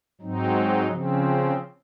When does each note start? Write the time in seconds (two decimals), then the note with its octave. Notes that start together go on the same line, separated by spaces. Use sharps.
0.21 G#2 F#3 C4 D#4
0.87 C#3 F3 C4